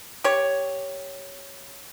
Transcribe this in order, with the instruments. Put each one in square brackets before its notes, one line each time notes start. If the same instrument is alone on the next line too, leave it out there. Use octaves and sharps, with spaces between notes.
[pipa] G4 C#5